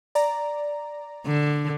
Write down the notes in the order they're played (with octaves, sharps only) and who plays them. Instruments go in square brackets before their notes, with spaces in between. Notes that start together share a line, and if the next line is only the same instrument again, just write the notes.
[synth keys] D5 A#5
[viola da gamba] D3